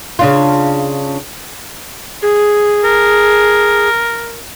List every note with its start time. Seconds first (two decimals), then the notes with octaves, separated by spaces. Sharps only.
0.19 C#3 D4 F4
2.22 G#4
2.84 A#4